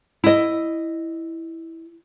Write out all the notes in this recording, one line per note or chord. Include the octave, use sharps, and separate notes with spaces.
E4 D#5